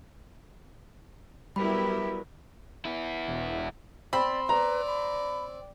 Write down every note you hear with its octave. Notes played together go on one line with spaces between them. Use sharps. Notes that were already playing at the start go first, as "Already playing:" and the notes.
F#3 G3 B3 E4 G4 A#4 B5
B3 E4
E1
C4 D5 B5
B4 D5 A#5
B5